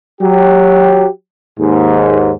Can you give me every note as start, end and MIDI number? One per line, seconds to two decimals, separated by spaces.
0.22 1.08 54
0.22 1.08 67
1.59 2.31 39
1.59 2.31 44